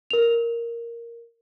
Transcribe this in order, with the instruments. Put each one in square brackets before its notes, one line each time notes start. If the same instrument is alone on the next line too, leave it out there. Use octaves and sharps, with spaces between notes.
[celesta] A#4 F7